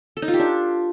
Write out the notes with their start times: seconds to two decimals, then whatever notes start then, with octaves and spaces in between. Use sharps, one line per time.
0.17 A4
0.22 D#4
0.28 F4
0.34 G4
0.39 D4